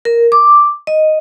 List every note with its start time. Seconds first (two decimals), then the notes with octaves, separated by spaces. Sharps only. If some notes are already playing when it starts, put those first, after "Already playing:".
0.05 A#4
0.32 D6
0.87 D#5